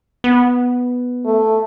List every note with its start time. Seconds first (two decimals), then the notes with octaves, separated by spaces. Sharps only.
0.24 B3
1.25 A3